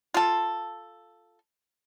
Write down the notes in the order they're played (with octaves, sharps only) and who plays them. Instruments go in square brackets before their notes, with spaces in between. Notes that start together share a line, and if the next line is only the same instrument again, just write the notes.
[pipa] F4 A4